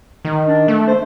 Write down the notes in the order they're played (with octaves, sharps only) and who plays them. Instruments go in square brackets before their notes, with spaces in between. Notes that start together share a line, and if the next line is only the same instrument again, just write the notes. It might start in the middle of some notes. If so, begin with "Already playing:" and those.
[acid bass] D#3
[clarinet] D4
[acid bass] A3
[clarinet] C5